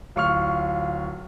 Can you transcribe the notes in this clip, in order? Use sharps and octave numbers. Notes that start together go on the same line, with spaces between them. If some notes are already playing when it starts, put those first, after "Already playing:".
D1 F4 C#6 F6